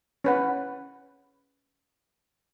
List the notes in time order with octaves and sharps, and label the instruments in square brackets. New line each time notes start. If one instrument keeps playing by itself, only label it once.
[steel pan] C#4 B4 F#5